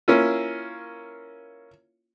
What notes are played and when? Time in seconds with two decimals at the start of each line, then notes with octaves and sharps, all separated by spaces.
0.08 A#3 C#4 E4 F4